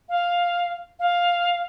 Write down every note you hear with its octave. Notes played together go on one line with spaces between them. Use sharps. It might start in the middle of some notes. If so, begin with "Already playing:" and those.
F5
F5